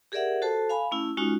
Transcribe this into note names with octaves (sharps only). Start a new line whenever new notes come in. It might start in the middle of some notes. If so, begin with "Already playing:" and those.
G4 G#4 A#4 D5 E5 F#5
F#4 A4 C5 A5
F5 G#5 B5
A3 C#4 E4
G#3 C#4 D#4 F4 F#4